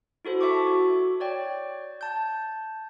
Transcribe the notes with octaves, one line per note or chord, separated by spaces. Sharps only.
E4 F#4 A4 C5
E5 A5 C#6 D6
F#4
C#5 D5 G5
A5 G6